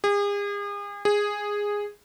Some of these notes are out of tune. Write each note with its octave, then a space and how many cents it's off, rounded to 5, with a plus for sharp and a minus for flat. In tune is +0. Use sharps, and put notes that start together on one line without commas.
G#4 -40
G#4 -10